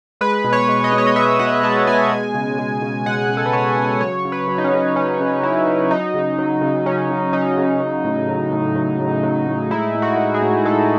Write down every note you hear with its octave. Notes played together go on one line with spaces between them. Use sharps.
G#3 B4
B2
C#5
G#3
D#5
B2
C#5
D#5
G#3 E5
B2 F#5
G#3 A5
B2 G#5
G#3
C#3
G#3
C#3
G#3 F#5
C#3
A4
B4
G#3 C#5
C#3
F#3 C#5
C#3
B4
F#3
D#4
C#4
C#3
F#3 C#4
C#3
F#3 E4
C#3
F#3 D#4
C#3
F#3
C#3
F#3 C#4
C#3
F#3 D#4
C#3
F#3
A2
F#3
A2
F#3
A2
F#3
A2
G#3 E4
A2
F#4
G#3
G#4
A2
G#3 A4